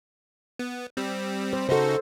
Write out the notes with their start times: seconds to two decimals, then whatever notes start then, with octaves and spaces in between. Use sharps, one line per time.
0.59 B3
0.97 G3 C4
1.53 C5
1.69 C#3 D#4 F#4 A4 C5